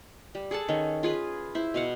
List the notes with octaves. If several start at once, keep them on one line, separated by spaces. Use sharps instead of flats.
G3
G#4 A4 F#5 A5
D#3 C#4
F4 G#4 B4
E4 C5
B2 F5 F#5